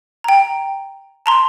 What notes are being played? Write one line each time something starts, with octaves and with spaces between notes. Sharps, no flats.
G5 A#5
A5 A#5 C6